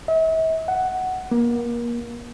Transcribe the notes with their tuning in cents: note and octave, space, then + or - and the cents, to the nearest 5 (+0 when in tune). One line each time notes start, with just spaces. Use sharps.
E5 -40
F#5 +5
A#3 +30